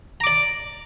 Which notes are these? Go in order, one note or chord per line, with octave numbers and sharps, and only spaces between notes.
D5 A#5 D6